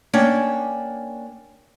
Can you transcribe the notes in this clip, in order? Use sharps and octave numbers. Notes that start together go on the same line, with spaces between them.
A#3 C#4 D4 G5